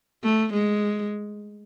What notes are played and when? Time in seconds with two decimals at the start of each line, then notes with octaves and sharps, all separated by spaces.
0.24 A3
0.53 G#3